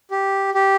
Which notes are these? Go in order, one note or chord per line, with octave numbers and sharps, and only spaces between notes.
G4
G4